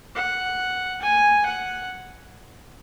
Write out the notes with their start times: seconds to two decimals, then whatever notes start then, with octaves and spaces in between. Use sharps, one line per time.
0.15 F#5
1.02 G#5
1.46 F#5